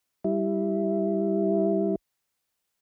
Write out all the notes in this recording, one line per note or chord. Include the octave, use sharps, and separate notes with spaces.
G3 E4